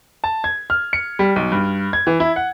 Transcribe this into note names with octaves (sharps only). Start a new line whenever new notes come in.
A5
G#6
F6
C#7
G3
B1
G2
G#6
E3
E4
F#5